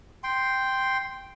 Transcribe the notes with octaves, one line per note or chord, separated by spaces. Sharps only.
G5 C6